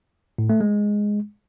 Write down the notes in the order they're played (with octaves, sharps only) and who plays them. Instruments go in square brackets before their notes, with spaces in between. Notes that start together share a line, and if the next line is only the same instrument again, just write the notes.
[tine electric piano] A2
A3
G#3